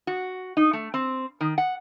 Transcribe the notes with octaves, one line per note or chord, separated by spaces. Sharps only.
F#4
D#4
A3
C4
D#3
F#5